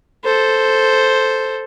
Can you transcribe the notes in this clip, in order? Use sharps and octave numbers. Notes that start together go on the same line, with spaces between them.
A4 C5